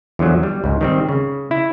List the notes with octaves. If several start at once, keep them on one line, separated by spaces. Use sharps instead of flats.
E2 D3 F3 F#3
G3
C#2 G#2
D#3 G3 C4
C#3
E4